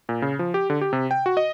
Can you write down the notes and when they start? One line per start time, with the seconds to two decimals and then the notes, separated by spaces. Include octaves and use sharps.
0.09 A#2
0.22 C#3
0.39 F3
0.54 G4
0.70 D3
0.81 G4
0.93 C3
1.11 G5
1.26 F#4
1.37 D#5